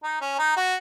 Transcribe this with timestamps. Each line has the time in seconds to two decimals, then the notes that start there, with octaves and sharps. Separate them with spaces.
0.03 D#4
0.21 C#4
0.39 D#4
0.57 F#4